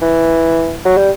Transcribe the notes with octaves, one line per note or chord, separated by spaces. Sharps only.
E3
F#3
G3